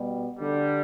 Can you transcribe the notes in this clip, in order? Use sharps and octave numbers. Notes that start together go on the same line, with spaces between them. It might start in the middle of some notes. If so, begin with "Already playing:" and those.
Already playing: B2 G3
D3 G3